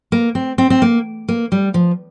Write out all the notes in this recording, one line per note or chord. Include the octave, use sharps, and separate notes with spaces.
A#3
C4
C4
C4
A#3
A#3
G3
F3